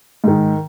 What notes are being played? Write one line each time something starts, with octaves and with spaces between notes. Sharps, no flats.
G#2 D#3